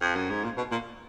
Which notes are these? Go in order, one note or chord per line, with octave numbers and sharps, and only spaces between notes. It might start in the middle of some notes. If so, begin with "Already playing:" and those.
F2
F#2
G#2
A#2
B2
A#2